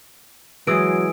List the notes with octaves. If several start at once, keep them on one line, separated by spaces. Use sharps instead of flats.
E3 F#3 G#3 G#4 D#6 E6 D7